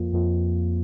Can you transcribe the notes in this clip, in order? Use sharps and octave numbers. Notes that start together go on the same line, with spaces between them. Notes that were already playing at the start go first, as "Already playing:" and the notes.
Already playing: F2 F3 A#3 F4
F2 F3 A#3 F4